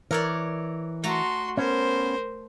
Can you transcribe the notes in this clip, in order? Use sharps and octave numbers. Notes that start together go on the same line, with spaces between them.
E3 A#4 C#5 D5
A3 F#4 A#5 C6
B3 C#4 A#4 C5